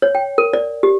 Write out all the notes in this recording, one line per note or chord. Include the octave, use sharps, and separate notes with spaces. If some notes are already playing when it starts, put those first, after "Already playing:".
C#5
G5
A#4
D5
G4